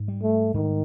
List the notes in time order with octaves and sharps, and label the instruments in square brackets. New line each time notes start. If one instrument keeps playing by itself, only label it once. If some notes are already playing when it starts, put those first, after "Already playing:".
Already playing: [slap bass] G#2
G3
[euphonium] A3
[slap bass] G#2 [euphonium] D#3